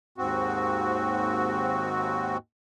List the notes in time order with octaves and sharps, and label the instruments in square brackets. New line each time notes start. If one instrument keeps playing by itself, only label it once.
[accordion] D#2 G#2 C4 F#4